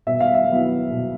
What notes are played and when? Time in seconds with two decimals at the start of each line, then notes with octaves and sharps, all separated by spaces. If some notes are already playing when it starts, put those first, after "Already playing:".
0.07 B2 E5
0.20 F5
0.34 E5
0.49 F#3 B3 E4
0.91 B2